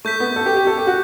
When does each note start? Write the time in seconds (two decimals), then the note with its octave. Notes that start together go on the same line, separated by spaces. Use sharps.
0.05 A3 C#6 G6 B6
0.20 B3
0.36 A4
0.46 G4
0.56 G4
0.67 A4
0.77 G4
0.87 F#4